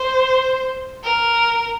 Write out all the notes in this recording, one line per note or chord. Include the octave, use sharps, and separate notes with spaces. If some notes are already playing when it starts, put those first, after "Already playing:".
Already playing: C5
A#4